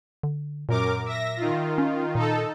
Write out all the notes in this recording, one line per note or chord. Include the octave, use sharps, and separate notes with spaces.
D3
F#2 A#2 A#4 D6
E5 A#6
D#3 F4
C#4
A#2 D#4 A4